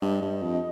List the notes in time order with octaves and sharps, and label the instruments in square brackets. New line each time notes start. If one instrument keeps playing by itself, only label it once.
[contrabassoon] G2 [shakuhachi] D#5
[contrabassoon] G2
F2